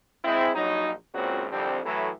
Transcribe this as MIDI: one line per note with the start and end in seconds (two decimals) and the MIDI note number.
0.24 0.50 56
0.24 0.50 60
0.24 0.50 64
0.55 0.91 34
0.55 0.91 54
0.55 0.91 63
1.15 1.47 32
1.15 1.47 37
1.15 1.47 46
1.15 1.47 49
1.15 1.47 60
1.15 1.47 66
1.52 1.79 36
1.52 1.79 41
1.52 1.79 50
1.52 1.79 55
1.52 1.79 60
1.85 2.09 45
1.85 2.09 52
1.85 2.09 54
1.85 2.09 57